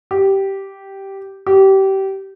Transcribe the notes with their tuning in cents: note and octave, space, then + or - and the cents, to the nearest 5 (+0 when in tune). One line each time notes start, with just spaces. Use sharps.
G4 -10
G4 -25